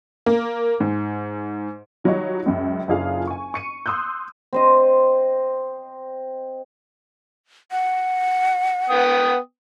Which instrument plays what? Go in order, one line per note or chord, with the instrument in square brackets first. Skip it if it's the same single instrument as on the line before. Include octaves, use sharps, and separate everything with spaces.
[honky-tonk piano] A#3
G#2
D#3 F#3 G3 D#4 F4 C#5
C#2 F#2
F#1 D4 F4 G#4 A4 F5
G#5 C#6
C#6 C#7 D#7
C6 D#6 E6 F#6 G6
[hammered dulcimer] C4 C5 D#5
[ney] F#5
[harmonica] B3 G5 D#6